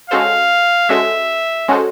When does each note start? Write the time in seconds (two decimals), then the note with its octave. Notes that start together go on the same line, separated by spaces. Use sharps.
0.10 G#3 C#4 F#4 A4 C5 F5
0.89 G#3 C#4 F#4 A4 C5 E5
1.68 G#3 C#4 F#4 A4 C5